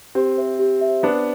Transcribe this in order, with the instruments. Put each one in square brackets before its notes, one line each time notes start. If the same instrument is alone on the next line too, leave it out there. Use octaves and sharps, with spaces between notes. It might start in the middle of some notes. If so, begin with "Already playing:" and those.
[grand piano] C4 [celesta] G4
[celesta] C5 E5
G4
C5 E5
[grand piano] B3 D4 [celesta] C5